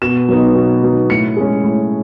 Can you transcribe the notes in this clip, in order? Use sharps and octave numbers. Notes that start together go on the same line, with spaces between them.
B2 E7
F#3 B3 D#4
B2
F#3 B3 D#4
A2 C#7
G#3 C#4
A2